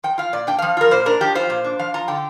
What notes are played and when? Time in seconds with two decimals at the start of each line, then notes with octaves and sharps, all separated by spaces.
0.04 F3 G5
0.18 F4 F5
0.33 A#2 D5
0.47 D4 G5
0.59 F3 F5
0.77 F4 A#4
0.91 A#2 C5
1.06 D4 A#4
1.21 F3 G4
1.35 F4 C5
1.50 A#2
1.64 D4
1.79 F3 F5
1.94 F4 A#5
2.08 D3 G5